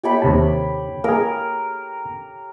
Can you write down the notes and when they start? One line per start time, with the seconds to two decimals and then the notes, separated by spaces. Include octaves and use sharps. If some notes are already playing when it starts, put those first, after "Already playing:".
0.03 G4 C#5 B5
0.22 D#2 C3 A5
1.04 A#3 G#4 A#4